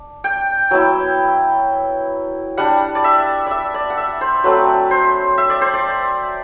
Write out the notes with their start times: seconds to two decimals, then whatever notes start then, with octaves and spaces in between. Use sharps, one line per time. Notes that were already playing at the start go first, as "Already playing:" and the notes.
Already playing: D4
0.24 G5
0.71 F#3 B3 E4 G5
2.57 G3 D4 F#5
2.95 D5
3.04 E5
3.47 D5 E5
3.74 D5
3.90 F#5
3.97 E5
4.21 C5
4.44 F#3 A3 C4 B4
4.91 C5
5.38 E5
5.50 D5
5.61 C5
5.74 D5